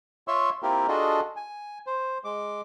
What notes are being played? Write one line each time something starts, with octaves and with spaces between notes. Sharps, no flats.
F4 C#5 E5 C6 C#6 E6
A#3 C4 E4 F4 G4 A#4
D4 F4 F#4 G#4 A4 D#5
G#5
C5
G#3 D6